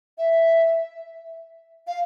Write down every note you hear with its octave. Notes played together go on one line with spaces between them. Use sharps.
E5
F5